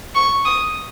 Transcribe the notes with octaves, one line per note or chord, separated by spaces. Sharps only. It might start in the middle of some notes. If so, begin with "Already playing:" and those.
C#6
D#6